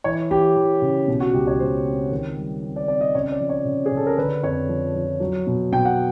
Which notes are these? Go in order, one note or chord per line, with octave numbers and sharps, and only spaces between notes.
E3 C#5
E3 G4
E3
C#3
B2
F#4
C#2 G4
C#5
C#2 C5
C4
D#3
G3
C4
D5
C4 D5
D#5
C#3 C#5
D5
F3
C#5
C#3
G#4
C#3
A4
A#4
D3 B4
F2 C#5
F3
F3
F#3
B2
B2 G5
F#5